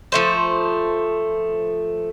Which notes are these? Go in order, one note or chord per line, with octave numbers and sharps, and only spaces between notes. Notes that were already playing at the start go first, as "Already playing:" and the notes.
F3 A3 C5